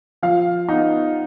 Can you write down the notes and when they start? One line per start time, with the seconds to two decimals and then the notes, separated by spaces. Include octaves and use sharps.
0.23 F3 F5
0.69 B3 D#4